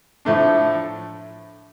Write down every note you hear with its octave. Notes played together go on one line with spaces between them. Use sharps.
A2 F3 A3 D4